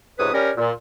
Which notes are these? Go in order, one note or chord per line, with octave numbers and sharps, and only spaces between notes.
C#2 G#2 C3 B4 C#5 D#6
G3 C#4 A#4
A#2